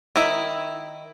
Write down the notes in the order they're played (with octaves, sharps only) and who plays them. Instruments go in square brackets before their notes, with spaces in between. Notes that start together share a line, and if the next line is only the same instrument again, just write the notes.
[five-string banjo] D#3 E4